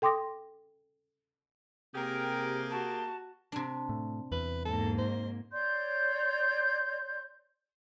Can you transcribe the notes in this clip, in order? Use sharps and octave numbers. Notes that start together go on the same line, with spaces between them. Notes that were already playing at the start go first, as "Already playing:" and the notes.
A4 G5 C6 D6 D#6 A#6
C3 A#3 G4 G#4 A#4 G5
F#4 A5
C3 D4
A2
E2 B4
G#2 A#3 A4
C5
C#5 D5 C6 G6